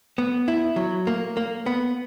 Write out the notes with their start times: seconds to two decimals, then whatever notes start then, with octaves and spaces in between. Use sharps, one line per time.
0.18 B3
0.48 E4
0.76 F#3
1.07 A#3
1.37 A#3
1.66 B3